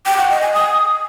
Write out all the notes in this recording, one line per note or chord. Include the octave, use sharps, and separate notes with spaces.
G5
F#5
D#5
G#5
D#6